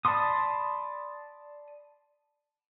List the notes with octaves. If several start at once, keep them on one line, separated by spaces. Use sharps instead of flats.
D5 A5 B5 C6 D#6